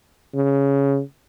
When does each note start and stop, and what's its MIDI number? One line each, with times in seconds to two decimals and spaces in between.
0.35 1.01 49